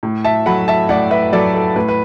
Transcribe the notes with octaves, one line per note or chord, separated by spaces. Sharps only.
A2
E5 A5
F#3 A3 F#5 B5
E5 A5
A2 D5 F#5
B4 E5
F#3 A3 A4 D5
A4
A2 B4
B4